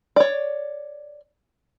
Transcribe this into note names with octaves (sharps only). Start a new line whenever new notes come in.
C#5 D5